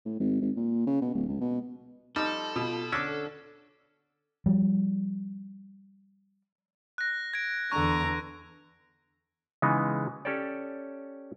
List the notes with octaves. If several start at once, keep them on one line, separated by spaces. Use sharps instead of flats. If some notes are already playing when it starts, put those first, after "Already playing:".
A2
G#1
G#1
A#2
C#3
B2
D1
C#2
B2
F3 G3 D#4 A4
B2 F4
D3 C#4 D4 D6 E6
F3 G3
F#6 A#6
G#6 D7
E2 D3 A#5 C#6 F#6
C#3 E3 G#3 B3 D#4
C#4 G4 A4 C#5 D5